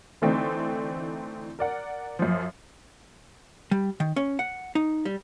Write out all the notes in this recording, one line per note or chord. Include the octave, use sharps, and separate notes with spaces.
D3 E3 A3 C4 D#4 E4
A#4 D5 F#5
F#2 F3
G3
D#3
C#4
F#5
D#4
G3